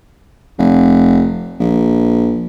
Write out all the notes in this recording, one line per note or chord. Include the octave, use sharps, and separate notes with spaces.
F1
A#1